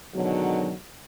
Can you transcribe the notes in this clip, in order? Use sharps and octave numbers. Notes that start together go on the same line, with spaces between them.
G#2 B2 D3 D#3 F#3